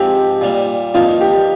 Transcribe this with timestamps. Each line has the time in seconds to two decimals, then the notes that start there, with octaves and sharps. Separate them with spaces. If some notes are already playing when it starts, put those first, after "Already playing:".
Already playing: G#2 F3 C4 G4
0.41 A#2 G3 A#3
0.94 G2 F3 A#3 D#4 F4
1.21 G4